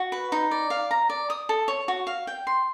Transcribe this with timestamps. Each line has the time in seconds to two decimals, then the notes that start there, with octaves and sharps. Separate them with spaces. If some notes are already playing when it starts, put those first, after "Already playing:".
Already playing: F#4
0.12 B4
0.32 D#4
0.51 D5
0.70 F5
0.91 A#5
1.10 D5
1.30 D#6
1.49 A4
1.68 C#5
1.88 F#4
2.07 F5
2.27 G5
2.47 C6